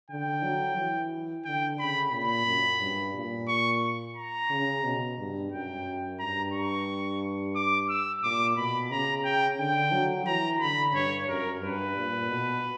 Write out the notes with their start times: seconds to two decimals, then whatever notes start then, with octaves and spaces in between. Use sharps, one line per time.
0.10 D3 G5
0.43 F#3
0.77 E3
1.45 D3 G5
1.79 C#3 B5
2.13 A#2 B5
2.47 F#2
2.80 G2
3.15 A#2
3.48 C#6
4.16 A#5
4.50 C#3
4.84 B2
5.18 G2
5.52 F#2 G5
6.19 G2 A#5
6.53 C#6
7.55 D6
7.89 E6
8.23 A#2 D6
8.57 B2 B5
8.91 C#3 A#5
9.24 G5
9.58 D3 G5
9.92 F#3
10.26 E3 A#5
10.60 D3 B5
10.94 G2 C#5
11.28 F#2 A#4
11.61 G2 B4
11.95 A#2
12.29 B2